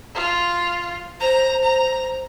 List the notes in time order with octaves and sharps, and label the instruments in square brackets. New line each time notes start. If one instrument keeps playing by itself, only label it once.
[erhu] F4
[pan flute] C5 [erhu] A#5
[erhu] A#5